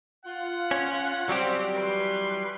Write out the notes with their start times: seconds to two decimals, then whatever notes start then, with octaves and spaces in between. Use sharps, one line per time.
0.25 F4 F#5
0.71 C#4
1.29 F#3 G3 C4 G4
1.74 E3 B4 C6